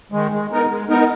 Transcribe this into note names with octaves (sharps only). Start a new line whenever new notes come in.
D#3 G#3
G#3
B3 D#4 A#4
G#3
B3 D#4 A#4